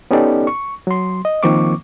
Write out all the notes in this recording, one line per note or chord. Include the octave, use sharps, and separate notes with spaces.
B3 C#4 D#4 G4 A4 D5
C#6
F#3 C6
D#5
D#3 F3 A#3 C4 C#6 D6